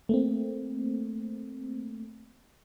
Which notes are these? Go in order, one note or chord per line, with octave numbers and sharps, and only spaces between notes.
A3 A#3 C4